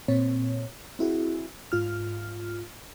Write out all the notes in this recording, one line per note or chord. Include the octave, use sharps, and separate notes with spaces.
A#2 C4 C#5
C4 E4 F#4 G#4
G#2 F4 F6